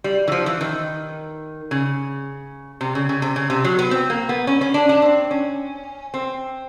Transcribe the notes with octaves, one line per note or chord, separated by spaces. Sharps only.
G3
E3
F3
E3
D#3
C#3
C3
C#3
C#3
C3
C#3
C3
F#3
B3
C4
A#3
B3
C#4
C#4
D4
D4
C4
C#4
C4